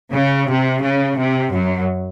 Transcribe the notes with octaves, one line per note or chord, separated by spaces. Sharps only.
C#3
C3
C#3
C3
F#2 F#3